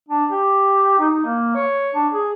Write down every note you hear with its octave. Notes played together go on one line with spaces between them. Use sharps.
D4
G4
D#4
A#3
C#5
D4
G#4